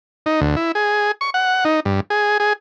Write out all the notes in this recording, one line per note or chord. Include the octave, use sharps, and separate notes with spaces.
D#4
D2
E4
G#4
C#6
F#5
D#4
G2
G#4
G#4